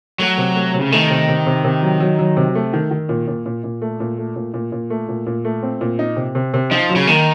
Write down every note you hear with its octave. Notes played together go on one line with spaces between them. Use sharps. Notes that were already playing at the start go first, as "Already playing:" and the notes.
F#3 A3
C3
A3
C3
C#3
D#3 A3
C3
C3
C3
C3
F#3
F#3
F#3
C3
A3
D#3
D#3
A#2
A#2
A#2
A#2
A3
A#2
A3
A#2
A#2
A#2
A3
A#2
A#2
A3
C4
A#2
D#4
C3
C3
C3
F3 D#4
F#3
C#3
D#3 A#3